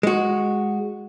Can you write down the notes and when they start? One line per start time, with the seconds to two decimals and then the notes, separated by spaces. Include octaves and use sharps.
0.03 G#3 F#4